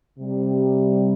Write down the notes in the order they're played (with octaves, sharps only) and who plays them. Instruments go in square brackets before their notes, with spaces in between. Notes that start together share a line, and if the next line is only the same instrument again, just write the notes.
[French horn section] C3 G3